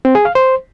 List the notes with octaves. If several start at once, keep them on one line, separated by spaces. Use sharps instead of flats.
C4
G#4
F5
C5